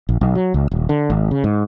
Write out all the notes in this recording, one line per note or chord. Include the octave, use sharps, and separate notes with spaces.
A#1
B1
F#3
C#2
D#1
D3
G#1
C#3
G#2